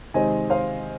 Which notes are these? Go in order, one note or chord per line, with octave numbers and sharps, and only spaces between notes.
C3 D#3 G#3 C4 D#5 G#5
C5 F5